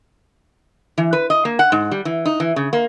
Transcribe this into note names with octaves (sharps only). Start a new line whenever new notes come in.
E3
B4
D#5
A#3
F#5
G#2
G3
E3
D#4
E3
C#3
A#3